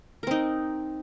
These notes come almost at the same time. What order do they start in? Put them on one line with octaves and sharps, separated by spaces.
A#4 C4 D#4